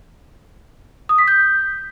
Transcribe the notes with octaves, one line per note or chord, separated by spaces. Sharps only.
D#6
B6
G6